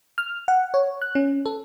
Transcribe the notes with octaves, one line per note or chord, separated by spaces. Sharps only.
F6
F#5
C#5
F#6
C#4
A4